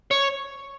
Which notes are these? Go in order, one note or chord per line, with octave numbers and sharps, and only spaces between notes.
C#5